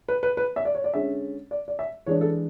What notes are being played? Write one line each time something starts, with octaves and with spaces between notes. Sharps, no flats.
B4
B4
B4
E5
D5
C#5
D5
D3 G#3 C#4 E5
D5
D5
E5
E3 G#3 D4 C#5
A4